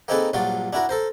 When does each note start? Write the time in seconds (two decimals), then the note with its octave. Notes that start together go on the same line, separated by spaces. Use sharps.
0.08 A#3 C4 D#4 G#4 A4 B4
0.33 A#1 G2 F#3 F4 D5
0.73 D4 E4 F#4 A#4
0.89 A4 A#4 C5